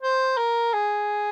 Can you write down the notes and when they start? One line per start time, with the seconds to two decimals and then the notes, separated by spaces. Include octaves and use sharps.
0.02 C5
0.37 A#4
0.73 G#4